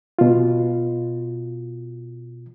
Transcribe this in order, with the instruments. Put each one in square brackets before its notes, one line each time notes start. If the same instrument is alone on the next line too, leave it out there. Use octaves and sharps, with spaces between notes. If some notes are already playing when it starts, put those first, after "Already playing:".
[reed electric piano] B2 F4